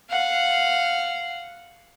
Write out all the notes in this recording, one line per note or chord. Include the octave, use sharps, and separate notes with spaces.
F5 F#5